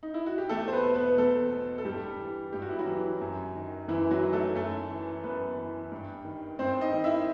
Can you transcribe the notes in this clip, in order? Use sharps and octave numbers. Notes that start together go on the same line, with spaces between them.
D#4
E4
F#4
G4
E2 A3 A4
C5
B3 B4
B2
B3 B4
E2 A3 A4
B2
A4
G2 G3 G4
E3
G2 G4
F#4
E4
F#3 F#4
E3
F#2
D#3
F#2 E3 E4
F#3 F#4
D#3
A3 A4
F#2 A3 A4
E3
F#2 B3 B4
E3
G2
D#3
G2 C4 C5
D#4 D#5
D#3
E4 E5